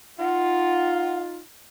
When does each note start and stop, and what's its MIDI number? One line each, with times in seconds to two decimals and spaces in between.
0.19 1.42 63
0.19 1.42 65
0.19 1.18 78